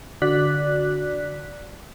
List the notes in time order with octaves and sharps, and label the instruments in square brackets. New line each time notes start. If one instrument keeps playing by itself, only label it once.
[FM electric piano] D3 F#4 D5 F#6 B6